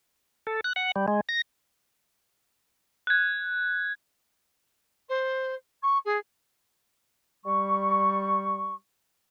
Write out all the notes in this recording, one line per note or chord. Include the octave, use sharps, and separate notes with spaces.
A4
F#6
F#5
G3
G#3
A#6
F#6 G#6
C5
C#6
G#4
G3 C#6